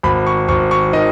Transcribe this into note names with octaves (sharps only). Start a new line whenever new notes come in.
G#1 B5
C#6
G#1 C#6
C#6
D#3 D#5